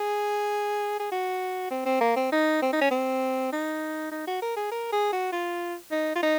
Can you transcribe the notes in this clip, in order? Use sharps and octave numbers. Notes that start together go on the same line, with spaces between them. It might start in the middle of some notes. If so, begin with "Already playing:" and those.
Already playing: G#4
G#4
F#4
C4
C4
A#3
C4
D#4
C4
D#4
C#4
C4
D#4
D#4
F#4
A#4
G#4
A#4
G#4
F#4
F4
D#4
F4
D#4